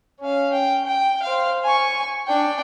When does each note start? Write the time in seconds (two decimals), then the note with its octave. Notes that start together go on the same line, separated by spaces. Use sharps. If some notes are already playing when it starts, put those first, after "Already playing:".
0.20 C#4 F5
0.53 G5
0.85 G5
1.22 C5 F5
1.64 G#5 C#6
2.28 D4 G5